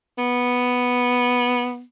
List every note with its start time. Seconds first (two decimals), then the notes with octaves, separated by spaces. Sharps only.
0.18 B3